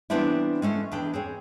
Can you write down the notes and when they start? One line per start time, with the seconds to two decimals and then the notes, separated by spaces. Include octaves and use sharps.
0.10 E3 G3 B3 C4 D4 E4
0.62 G#3 A3 C#4
0.92 E2 D4 G5
1.14 C4 G#4 C#5